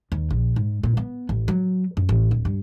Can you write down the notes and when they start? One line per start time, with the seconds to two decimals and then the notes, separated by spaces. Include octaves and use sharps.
0.12 D#2
0.31 A#1
0.56 G#2
0.83 A#2
0.97 B3
1.29 A1
1.48 F#3
1.97 F#2
2.09 A1
2.31 D1
2.45 G2